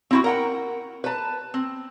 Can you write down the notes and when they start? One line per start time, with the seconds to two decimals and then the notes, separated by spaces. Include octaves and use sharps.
0.11 C4 E4 F#4
0.24 A#4 F#5 G5
1.04 B4 A5
1.54 C4